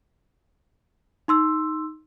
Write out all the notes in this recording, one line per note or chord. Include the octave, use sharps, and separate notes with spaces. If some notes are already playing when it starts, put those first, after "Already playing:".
D#4 C6 E6